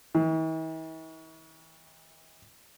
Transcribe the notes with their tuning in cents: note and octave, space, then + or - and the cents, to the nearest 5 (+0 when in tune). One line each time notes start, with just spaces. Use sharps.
E3 -45